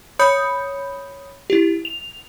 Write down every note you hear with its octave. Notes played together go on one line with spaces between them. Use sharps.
C#5 B5 D#6 G6 C#7
E4 G4
F7